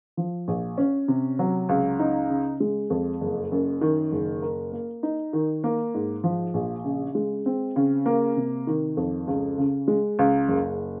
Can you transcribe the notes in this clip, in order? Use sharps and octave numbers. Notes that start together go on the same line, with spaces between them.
F3
A#1
C#4
C3
F#3
C#2
D#4
C#3
G#3
F2
F#1
F#2
D#3
F#1
A#4
A#3
D#4
D#3
A#3
G#2
F3
A#1
C#3
G#3
C4
C#3
A#3
C3
D#3
F2
C#2
C#3
G#3
C#2
F#1